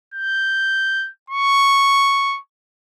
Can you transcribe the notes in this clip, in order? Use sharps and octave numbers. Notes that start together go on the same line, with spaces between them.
G6
C#6